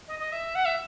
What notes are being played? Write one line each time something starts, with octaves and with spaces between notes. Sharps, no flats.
D#5
D#5
E5
F#5
E5